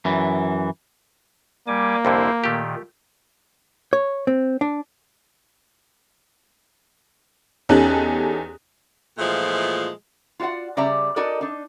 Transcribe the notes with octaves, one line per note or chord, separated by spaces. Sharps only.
F#2 E3
G3 A#3 G#5 D6
C2 F2 D3 E4 C5
A#2 D#3 A3 G4
C#5
C4
D4
E2 C#4 D#4 G4 A4 F#6
A#2 E3 F3 G#3 A3
F4 F#4 D5 D#5 F#5
C#3 G3 D5 E5 A#5
D#4 F#4 A4 A#4 D5 D#5
D4 D#4